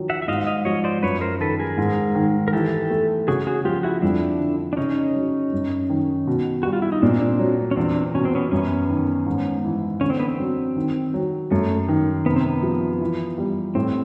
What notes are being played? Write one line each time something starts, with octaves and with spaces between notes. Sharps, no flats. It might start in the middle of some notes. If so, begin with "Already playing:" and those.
Already playing: D#3 F3 F#3
E5 F#5
E5
G#2 D#5 F5
D#5 F5
F3 C#5 D#5
C5 D5
F#2 B4 C#5
A#4 C5
D#3 A4 B4
G#4 A#4
G#2
D#3
A#4
E3 G4 A4
A3
C#3 F#4 G#4
F#4 G#4
F3 F4 G4
E4 F#4
F2 D4 E4
D3
D4
C#3 C#4 D#4
F#3
F#2
D#3
B2
G3 F#4
F4
E4
D#4
A#2 C4 D4
F#3
C#4
E2 C4 D4
B2 C#4
C4
B3 C#4
F#2 B3 C#4
D#3
G#2
E3
D3 C#4
C4
B3
C4
F#3
D#3
F#3
F#2 A3
D#3
C3 B3
C4
B3
F3
E3
G3
A2 C4